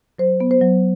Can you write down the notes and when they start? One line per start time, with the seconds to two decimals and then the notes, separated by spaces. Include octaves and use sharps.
0.19 F#3 C5
0.40 B3
0.51 C5
0.61 F#3